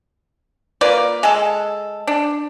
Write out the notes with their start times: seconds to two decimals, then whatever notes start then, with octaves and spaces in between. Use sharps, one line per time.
0.81 A#3 F4 B4 D5
1.23 G#3 G#4 A4
2.07 D4